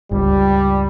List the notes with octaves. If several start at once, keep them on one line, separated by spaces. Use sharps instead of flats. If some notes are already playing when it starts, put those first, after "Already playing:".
G1 C#2 G3